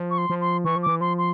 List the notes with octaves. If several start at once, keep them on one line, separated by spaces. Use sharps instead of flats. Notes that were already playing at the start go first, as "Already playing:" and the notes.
Already playing: F3
C#6
C6
F3
C6
E3 C#6
F3
E3 D6
F3 C6
C6